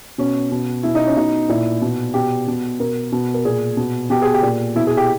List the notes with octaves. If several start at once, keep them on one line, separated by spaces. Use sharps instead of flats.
B2 C#4
B2
B2 E4
D#4
C#4
B2 D#4
A#2 E4
B2
B2 G4
B2
B2 A#4
B2
A#4
A#2 G#4
B2
B2 G4
G#4
G4
A#2
B2 E4
G#4
G4